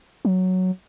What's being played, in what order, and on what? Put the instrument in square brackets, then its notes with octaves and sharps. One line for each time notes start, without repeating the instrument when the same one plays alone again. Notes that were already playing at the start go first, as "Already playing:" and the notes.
[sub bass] F#3